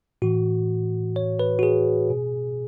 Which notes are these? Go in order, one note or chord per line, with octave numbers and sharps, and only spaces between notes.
A2 E3 F#4
C#5
B4
F#4
G#4
B2